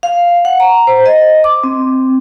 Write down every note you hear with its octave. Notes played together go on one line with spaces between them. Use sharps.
F5
F#5
A#5
C5
D#5
D6
C4